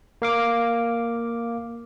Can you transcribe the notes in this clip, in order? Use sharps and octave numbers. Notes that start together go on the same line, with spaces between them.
A#3 F5 D6